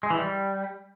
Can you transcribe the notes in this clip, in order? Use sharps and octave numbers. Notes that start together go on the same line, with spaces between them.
G#3
E3
G3